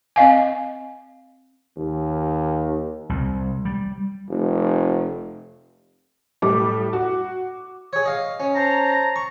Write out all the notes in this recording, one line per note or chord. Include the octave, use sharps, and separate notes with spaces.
C4 D#5 F5 G#5
D#2
C2
G3
F1
A2 G3 D6
F#4
G#4 C#5
D#5 F5
C#4
C5 A5 A#5
C#6